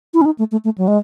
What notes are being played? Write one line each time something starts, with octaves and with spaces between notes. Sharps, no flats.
E4
C#4
D#4
A3
A3
A3
F#3
G#3